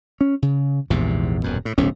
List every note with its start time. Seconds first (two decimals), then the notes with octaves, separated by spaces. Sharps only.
0.21 C#4
0.42 C#3
0.90 A#1 E2 G#2 C3
1.42 D#1 F#2 B2
1.65 A2
1.78 D1 B1 A2 C#4